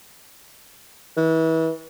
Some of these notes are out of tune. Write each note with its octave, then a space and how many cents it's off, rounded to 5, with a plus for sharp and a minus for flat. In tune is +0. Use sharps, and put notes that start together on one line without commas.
E3 -30